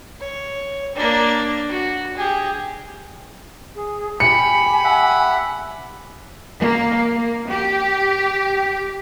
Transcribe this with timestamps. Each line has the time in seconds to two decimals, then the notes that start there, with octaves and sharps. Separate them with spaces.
0.21 C#5
0.95 A#3 D4
1.69 F#4
2.17 G4 G#4
3.75 G#4
4.20 G4 G#5 B5 C#7
4.84 E5 F#5
6.60 A#3
7.16 A#3
7.48 G4